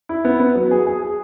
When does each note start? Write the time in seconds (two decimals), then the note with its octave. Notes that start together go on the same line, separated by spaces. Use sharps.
0.09 E4
0.25 B3
0.40 B3
0.55 F#3
0.71 G#4
0.87 G#4
1.02 G#4